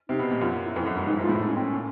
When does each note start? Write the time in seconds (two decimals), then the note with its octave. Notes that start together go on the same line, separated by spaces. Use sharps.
0.09 C3 D#4
0.19 B2
0.31 A#2
0.41 F#2 F4
0.52 F4
0.64 E4
0.76 F2
0.86 F#2
0.96 G2
1.07 G#2 D#4
1.15 E4
1.19 G#2
1.23 F4
1.29 A2 E4
1.40 D#4
1.48 C#4
1.56 C4
1.65 C#4
1.73 A#2